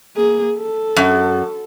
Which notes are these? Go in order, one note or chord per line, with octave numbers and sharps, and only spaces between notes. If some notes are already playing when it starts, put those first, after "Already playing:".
A#3 G#4
A4
F#2